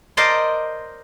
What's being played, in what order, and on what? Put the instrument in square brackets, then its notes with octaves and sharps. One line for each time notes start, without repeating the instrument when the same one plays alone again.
[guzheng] A#4 C5 D5 D#5 A5 C6